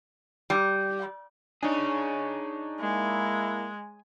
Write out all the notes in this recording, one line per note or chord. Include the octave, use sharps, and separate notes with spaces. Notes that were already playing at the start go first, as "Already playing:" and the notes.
G3
D4 D#4 G#4 C#5
G#3 A#3 E4